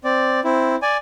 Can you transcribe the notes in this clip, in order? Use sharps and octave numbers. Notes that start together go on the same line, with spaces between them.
C4 D5
C4 E4
D5 G#5